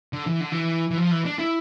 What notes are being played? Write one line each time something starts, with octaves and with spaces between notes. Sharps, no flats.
D3
E3
D3
E3
E3
F3
E3
D4
E4